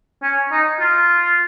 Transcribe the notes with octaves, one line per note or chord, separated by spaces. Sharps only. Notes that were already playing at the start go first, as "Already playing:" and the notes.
C#4
D#4
F4